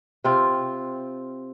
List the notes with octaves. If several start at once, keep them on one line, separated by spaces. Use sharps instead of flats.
C3 C4 F4